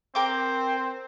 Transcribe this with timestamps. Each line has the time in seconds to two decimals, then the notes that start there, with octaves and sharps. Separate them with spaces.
0.15 C4 A#4 G5 D6